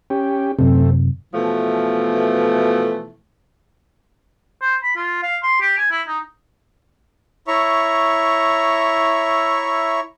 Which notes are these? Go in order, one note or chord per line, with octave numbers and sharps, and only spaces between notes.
C#4 G4
F#2 C3 A3 C4
B2 E3 F3 A3
C5
B5
F4
F5
C6
G4
G#5
E4
D#4
E4 C#5 E5 A#5 C#6